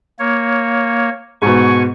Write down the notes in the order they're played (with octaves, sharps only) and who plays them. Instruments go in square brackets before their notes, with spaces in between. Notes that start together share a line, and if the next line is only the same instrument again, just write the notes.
[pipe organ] A#3 C#5
[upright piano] G#2 B2 [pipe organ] G#5 C#6